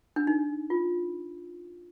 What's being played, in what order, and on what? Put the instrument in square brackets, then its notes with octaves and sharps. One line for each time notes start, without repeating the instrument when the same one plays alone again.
[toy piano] D4
D#4
F4